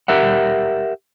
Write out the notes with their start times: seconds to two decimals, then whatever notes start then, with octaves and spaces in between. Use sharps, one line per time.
0.08 G4 A#4 E5 F#5